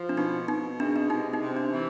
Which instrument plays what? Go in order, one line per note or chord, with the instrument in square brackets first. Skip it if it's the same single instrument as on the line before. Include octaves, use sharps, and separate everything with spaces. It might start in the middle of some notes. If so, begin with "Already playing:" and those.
Already playing: [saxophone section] F3
[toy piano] D4
[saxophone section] B2 [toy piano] D#4
[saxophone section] B2 [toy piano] D#4
[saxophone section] G#3 [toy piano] D4
[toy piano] D4
[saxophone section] C3 [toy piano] D#4
[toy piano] D#4
[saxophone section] C3
[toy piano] D4
[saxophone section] E3